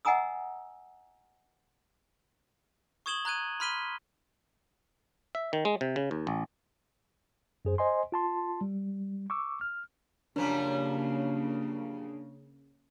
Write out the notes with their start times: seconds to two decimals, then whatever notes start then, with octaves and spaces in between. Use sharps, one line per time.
0.05 D#5 F#5 G#5 A#5 D#6 E6
3.06 C#6 D#6 G#6 E7 F#7 G7
3.25 A#5 F#6 G#6 D#7
3.60 B5 C6 F6 B6 D#7 G7
5.35 E5
5.53 D#3
5.65 G#3
5.81 C3
5.96 C#3
6.11 D#2
6.27 A1
7.65 F#2 G#4 C5
7.78 C5 D#5 G#5 C6
8.12 F4 A5 C6
8.61 G3
9.30 C#6 D6 E6
9.61 F6
10.36 F#2 C#3 F3 G3 A#3 D4